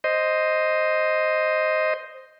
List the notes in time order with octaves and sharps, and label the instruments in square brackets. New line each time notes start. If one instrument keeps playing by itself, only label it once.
[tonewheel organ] C5 D#5